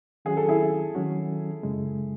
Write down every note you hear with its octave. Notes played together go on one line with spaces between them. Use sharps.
D#3 F#3 C#4 F#4 G#4
A4
E4 G#4
D#3 F#3 C#4 F#4
F#2 C#3 G#3